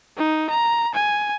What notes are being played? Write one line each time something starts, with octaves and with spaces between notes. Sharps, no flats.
D#4
A#5
G#5